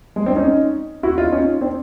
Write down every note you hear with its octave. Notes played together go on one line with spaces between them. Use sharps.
G#3
C4 D4
C#4 D#4
E4 F#4
D#4 F4
C#4 D#4
C4 D4